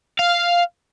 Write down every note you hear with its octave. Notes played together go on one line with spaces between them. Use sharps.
F5